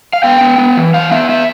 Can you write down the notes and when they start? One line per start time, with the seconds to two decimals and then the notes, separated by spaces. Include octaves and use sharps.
0.13 F5
0.23 B3 G5
0.41 B3
0.58 B3
0.77 E3
0.94 E3 F5
1.11 B3 E5
1.29 B3 E5